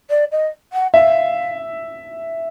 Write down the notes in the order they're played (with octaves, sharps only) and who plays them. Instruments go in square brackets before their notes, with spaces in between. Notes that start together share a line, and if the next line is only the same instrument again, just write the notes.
[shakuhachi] D5
D#5
F#5
[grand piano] E5 [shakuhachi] F5